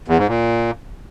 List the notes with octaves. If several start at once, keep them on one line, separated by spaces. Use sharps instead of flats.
E2
G#2
A#2